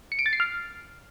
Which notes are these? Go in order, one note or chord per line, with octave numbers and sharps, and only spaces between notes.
C#7
D7
A6
C7
F6